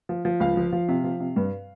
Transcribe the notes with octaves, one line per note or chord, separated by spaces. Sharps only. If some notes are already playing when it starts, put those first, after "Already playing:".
F3
F3
C#2 F5
F3
F3
C3
F3
C3
G2